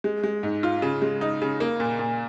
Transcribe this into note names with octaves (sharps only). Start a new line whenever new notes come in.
G#3
G#3
G#2
F4
C#3
G#3
D#4
C#3
A#3
A#2
A#2